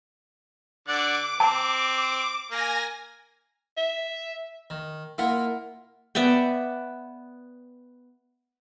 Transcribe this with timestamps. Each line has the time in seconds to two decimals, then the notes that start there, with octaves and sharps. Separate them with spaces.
0.88 D3 D5 F#5 D6
1.40 C4 A5
2.51 A#3 G#5 A#6
3.77 E5
4.70 D#3
5.18 A#3 E4 F4 A#4 F#5
6.15 B3 D5 E5 G5